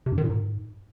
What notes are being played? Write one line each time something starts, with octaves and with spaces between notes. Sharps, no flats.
C3
G2
D#3
A#2
G#2